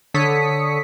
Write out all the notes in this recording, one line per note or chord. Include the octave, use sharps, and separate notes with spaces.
D3 A4 C#5 D#6 B6 C#7